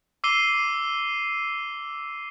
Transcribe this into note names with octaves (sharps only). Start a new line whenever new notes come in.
D6 E6 C7 D#7 G7